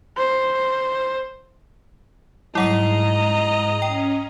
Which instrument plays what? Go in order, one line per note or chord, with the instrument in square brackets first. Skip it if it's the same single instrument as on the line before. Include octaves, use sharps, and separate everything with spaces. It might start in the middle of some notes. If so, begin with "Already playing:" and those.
[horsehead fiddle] C5
[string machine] G#2 [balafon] F#3 G3 [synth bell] E4 F#5 C7 [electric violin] D#5 A#5
[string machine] C#4 [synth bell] G5